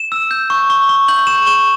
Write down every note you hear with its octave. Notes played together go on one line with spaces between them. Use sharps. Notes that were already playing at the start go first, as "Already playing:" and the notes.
Already playing: E7
E6
G6
C#6
C#6
C#6
G6 F#7
C#6 E7
C#6 E7